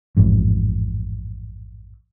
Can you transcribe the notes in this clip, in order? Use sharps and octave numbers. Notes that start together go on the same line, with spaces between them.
A1 F2 G#2